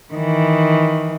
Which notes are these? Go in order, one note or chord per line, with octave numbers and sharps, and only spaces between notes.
D#3 E3